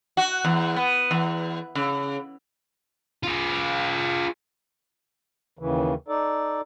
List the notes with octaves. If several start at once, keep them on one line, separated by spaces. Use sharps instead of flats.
F#4
E2
B3
E2
C#3
F4 G#4
D#2 C#3 E3
D#4 A4 D5